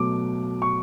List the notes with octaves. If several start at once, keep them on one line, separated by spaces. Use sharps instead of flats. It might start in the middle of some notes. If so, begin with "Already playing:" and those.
Already playing: B2 F#3 A3 D6
C#6